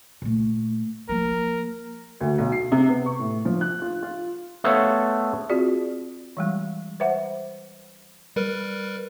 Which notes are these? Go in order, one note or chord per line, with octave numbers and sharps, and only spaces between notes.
A#2 A3
F3 A#3 A#4
D2
B1
C7
C3
B3
C#6
A2
F3
F#6
F4
F4
A3 B3 A4 C5 C#5 F5
C4 F4 F#4 G#4 D5
E3 G3 G#3
B4 C5 E5 F#5
G3 A#4 B4